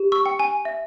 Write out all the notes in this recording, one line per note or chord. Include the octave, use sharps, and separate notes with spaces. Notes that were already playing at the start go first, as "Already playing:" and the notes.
Already playing: G4
C#6 E6
G5
G#5
E5